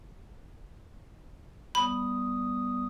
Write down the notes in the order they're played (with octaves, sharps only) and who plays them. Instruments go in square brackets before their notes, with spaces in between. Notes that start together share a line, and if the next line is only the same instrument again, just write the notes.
[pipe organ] G3 B3 D#6 [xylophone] B5